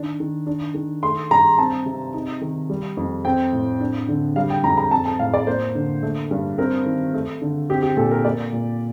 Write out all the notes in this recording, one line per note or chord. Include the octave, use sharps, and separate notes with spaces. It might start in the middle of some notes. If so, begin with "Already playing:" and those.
Already playing: D#3 D4
D#3
D4
D#3
A3 C6
G2 A#5
C4 A5
C3
D#4
D#3
G3
F2
C4 G5
A2
D4
D3
G3 F5
G5
F2 A#5
A#5
C4 A5
A5
A2 F5
D5
A#3 C5
D3
A3
G2
C4 A#4
D#3
A3
D3
C4 G4
G4
A#2 A4
A#4
A#3 D5
A#2